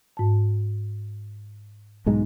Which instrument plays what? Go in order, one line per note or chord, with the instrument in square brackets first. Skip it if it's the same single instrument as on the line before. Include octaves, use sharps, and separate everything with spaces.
[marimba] G#2 A5
[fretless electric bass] B1 G#2 G#3